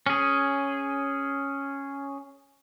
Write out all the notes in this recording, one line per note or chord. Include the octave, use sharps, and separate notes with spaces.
C#4 G#4